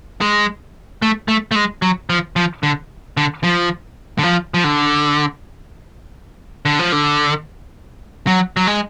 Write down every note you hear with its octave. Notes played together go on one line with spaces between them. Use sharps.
G#3
A3
A3
A3
G#3
F#3
F3
F3
D3
D3
F3
D3
F3
F3
D3
D3
F3
D3
F#3
F#3
G#3